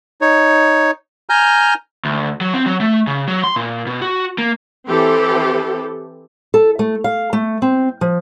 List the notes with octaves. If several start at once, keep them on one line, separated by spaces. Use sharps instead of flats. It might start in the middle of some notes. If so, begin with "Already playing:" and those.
D#4 C#5
G#5 A#5 F6 G6
D2
F#3
C4
F#3
A3
C#3
F#3
C6
A#2
B2
F#4
A#3
E3 C4 G4 A4
A4
A3
F5
A3
C4
F3